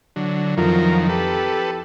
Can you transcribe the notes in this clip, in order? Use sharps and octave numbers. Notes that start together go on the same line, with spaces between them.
D3 F#3
F2 D#3 F3 F#3 E4 A#4
G4 A4 B4